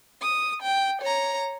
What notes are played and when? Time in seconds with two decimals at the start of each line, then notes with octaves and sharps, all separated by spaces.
0.22 D#6
0.62 G5
1.02 C#5 A#5